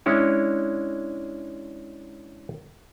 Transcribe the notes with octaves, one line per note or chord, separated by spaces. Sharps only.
G#3 C#4 D4 E4 C#5